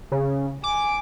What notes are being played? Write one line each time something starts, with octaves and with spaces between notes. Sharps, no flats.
C#3
G#5 D6